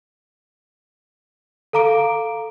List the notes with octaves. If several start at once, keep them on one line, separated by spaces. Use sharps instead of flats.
A4 F5 A#5 D6 D7